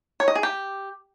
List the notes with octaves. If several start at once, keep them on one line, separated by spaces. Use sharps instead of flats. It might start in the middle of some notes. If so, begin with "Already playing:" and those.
C#5
D#5
G#4
G4